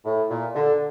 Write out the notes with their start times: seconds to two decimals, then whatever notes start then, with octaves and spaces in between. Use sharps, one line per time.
0.05 A2
0.30 A#2
0.54 D3